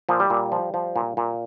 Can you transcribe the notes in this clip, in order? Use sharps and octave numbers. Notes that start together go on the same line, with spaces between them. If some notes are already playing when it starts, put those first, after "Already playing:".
A#2 F3
G3
A#2
F3
F3
A#2
A#2